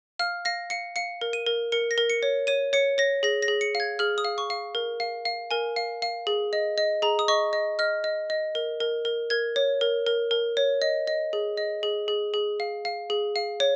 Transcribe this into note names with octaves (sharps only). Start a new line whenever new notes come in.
F5 F6
F5 A#6
F5 C#7
F5 C#7
A#4
D#7
A#4
A#4 C#7
A#6
A#4
C#7
C#5
C#5 D#7
C#5 C#7
C#5 A#6
G#4 A#6
A#6
G#4
C#7
F5
G#6
G#4 F6
D#6
F5
C#6
F5
A#4
F5
F5
A#4 G#5
F5
F5
G#4
D#5
D#5
G#4 A#5
D#6
D#5 C#6
D#5
D#5 F6
D#5
D#5
A#4
A#4
A#4
A#4 G#6
C#5
A#4
A#4
A#4
C#5
D#5
D#5
G#4
D#5
G#4
G#4
G#4
F5
F5
G#4
F5
C#5